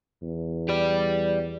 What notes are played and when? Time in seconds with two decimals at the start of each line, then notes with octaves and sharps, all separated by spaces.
0.22 E2
0.69 G4 D5